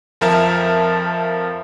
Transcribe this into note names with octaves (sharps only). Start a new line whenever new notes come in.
F2 F3 A#4 E5 A5